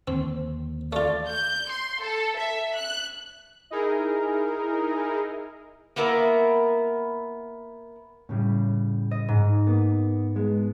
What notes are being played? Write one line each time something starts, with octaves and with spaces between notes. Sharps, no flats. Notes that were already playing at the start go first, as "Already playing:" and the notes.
D#2 D3 C4
A3 F4 D5
G6
C6
A4
E5
F#6
D#4 E4 G#4 A#4
A#3 B3 E4 A#4
A2 C#3 G3
D#5
G#2
A#3 B3
G#3 B3